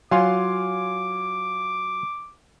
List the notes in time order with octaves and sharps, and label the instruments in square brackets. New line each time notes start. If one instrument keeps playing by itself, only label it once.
[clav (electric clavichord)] F#3 F4 [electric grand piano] F5 G#5 C6 [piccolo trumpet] D6